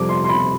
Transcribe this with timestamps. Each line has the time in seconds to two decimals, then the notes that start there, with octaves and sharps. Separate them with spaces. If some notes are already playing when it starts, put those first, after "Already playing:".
Already playing: F2 C3 G3 D6
0.09 C6
0.24 C6
0.29 B5